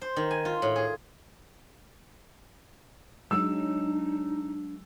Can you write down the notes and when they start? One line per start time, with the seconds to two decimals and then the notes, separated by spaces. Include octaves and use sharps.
0.01 C5
0.16 D#3
0.31 G#5
0.45 F4
0.62 A2
0.76 G#4
3.31 F#3 G#3 D4 D#4 E6